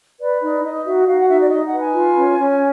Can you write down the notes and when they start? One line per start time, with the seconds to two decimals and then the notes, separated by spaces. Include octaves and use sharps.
0.20 B4 D5
0.42 D#4 D5
0.63 D#4 D#5
0.85 F#4 E5
1.07 F#4 F5
1.18 F#5
1.29 D#4 E5
1.40 D5
1.50 D#4 D#5
1.65 F#5
1.73 B4
1.79 G#5
1.94 F4
2.16 C#4
2.38 C#4